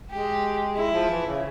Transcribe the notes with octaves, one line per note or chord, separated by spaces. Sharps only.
G#3 G4
G#3 E4
F3
E3
C#3